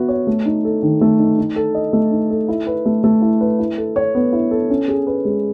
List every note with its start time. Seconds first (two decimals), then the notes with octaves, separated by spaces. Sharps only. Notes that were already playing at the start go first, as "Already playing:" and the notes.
Already playing: B3 F#4 E5
0.08 C#5
0.27 A3
0.46 D#4
0.65 A4
0.83 D#3
1.01 A3
1.20 D#4
1.38 D#4
1.56 A4
1.75 D#5
1.93 A3
2.12 D#4
2.30 A4
2.49 E4
2.67 B4
2.86 A3
3.04 A3
3.22 E4
3.41 B4
3.59 E4
3.78 A4
3.96 C#5
4.15 B3
4.33 E4
4.51 A4
4.70 C#4
4.88 G#4
5.07 B4
5.25 G#3